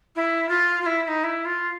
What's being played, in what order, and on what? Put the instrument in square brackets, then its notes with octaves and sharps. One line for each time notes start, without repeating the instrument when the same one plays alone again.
[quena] E4
F4
F4
E4
E4
D#4
E4
F4